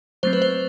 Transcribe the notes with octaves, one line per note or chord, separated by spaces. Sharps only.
F#3 A3 C4 C5
B4
C5